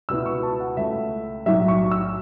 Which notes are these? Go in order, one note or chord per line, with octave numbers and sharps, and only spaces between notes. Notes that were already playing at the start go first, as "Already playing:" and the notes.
C#2 B2 B3 E4 E6
C#6
A5
F#5
C#2 C#3 A3 E5
B1 A2 F#3 E5
C#6
E6